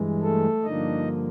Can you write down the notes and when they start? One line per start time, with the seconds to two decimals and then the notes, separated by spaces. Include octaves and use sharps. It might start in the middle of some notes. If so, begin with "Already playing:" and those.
Already playing: G2 E3 G#3
0.22 A3 A4
0.64 G2 D3 F3 A#3 D4 D#4 D#5